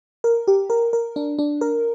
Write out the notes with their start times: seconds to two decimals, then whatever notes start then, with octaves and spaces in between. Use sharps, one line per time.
0.24 A#4
0.48 G4
0.70 A#4
0.93 A#4
1.16 D4
1.39 D4
1.61 A#4